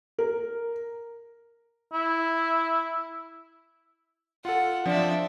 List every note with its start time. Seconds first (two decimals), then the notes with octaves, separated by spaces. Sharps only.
0.18 A#4
1.93 E4
4.45 F4 A4 F#5
4.86 F3 C4 D4 E5